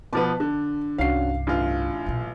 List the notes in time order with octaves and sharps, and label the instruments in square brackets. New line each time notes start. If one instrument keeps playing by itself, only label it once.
[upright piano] B2 F3 B3 [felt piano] A5 D6
[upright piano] D3
[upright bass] C2 G2 [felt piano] C#4 D4 F#4 [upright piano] F5 C7
[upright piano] A1 F4 [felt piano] D4
[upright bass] B1 A#2